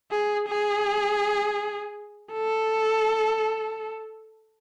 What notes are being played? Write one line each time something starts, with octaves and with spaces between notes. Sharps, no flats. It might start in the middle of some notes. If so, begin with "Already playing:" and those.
G#4
G#4
A4